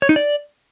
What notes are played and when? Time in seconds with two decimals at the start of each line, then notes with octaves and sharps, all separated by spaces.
0.02 C#5
0.09 D#4
0.16 D5